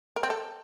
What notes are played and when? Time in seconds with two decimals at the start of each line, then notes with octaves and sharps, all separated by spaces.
0.16 A#4
0.23 C4
0.30 A4